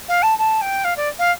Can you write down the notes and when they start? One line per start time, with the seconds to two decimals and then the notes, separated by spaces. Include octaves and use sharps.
0.08 F5
0.22 A5
0.38 A5
0.61 G5
0.84 F5
0.96 D5
1.18 F5